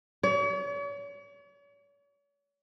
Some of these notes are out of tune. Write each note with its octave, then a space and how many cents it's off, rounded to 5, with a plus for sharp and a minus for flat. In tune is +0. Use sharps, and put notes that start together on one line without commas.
C#5 +45